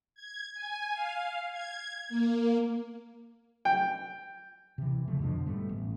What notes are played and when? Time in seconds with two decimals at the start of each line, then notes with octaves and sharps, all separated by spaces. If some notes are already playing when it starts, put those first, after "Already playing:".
0.15 G#6
0.54 G#5
0.93 F5
1.51 G#6
2.09 A#3
3.65 G5
4.78 C3 E3
5.08 C#3 F3 A3
5.19 F2 B2 D3 F3
5.46 G#2 G3 A3 B3
5.69 A1